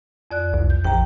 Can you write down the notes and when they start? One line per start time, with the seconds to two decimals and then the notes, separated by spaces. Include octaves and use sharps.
0.31 F2 D5 F#6
0.53 C2
0.70 G6
0.84 A#1 G5 A#5